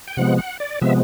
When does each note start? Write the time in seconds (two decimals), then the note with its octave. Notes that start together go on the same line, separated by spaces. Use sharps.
0.08 G5
0.17 C3 F3 G#3 B3 F#5
0.38 F#5
0.60 D5
0.81 C3 F3 G#3 B3 E5